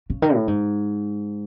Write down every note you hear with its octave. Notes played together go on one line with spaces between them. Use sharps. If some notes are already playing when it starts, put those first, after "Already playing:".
C#3
D#3
A2
G#2